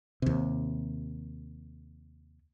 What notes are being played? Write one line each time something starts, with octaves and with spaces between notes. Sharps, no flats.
D#2 C3